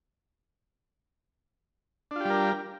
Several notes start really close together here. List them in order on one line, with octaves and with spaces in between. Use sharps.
D4 F4 G4 G3 A#4